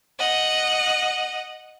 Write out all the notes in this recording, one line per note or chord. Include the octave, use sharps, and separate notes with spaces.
D#5 F#5